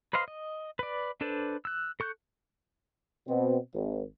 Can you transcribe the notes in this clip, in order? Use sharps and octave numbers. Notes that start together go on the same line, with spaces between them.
B4 C5 D#5 F5 C6
D#5
B4 D5
D4 A4 B4 C5 D5
E6 F#6
A4 C#6 F#6 G6
B2 C4
G#1